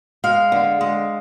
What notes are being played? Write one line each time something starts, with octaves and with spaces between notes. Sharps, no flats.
G#3 F5
D3
G#3